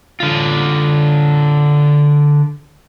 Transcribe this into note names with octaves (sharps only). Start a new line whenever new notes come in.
D3 F4